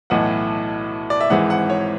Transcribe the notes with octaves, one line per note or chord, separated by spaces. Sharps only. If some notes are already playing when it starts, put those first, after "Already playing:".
B1 A2 E3 F#5
D5
E5
G#1 G#2 E3 F#5
F#5
C#5